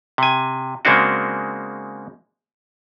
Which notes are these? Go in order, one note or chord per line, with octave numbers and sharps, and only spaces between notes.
C3 G#5
C#3 G#3 A#3 C4 D4 F#4